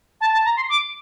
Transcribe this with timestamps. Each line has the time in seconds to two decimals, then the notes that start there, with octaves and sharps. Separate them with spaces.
0.20 A5
0.32 A5
0.45 A#5
0.56 C6
0.69 D6